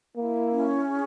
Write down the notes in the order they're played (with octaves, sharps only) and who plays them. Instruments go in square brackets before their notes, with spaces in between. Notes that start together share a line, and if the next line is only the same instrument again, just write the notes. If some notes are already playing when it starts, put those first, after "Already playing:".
[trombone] A#3 [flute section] E4
[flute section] C#4
G#4